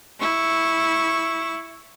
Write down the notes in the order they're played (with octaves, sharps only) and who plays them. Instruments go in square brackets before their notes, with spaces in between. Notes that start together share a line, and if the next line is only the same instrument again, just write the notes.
[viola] E4 C#6